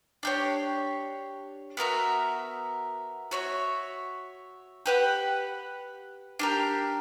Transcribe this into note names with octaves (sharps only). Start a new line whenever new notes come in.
D4 G4 C#5
B3 F#4 A#4 E5
F#4 C#5 E5
G4 B4 F#5
D4 G4 A#4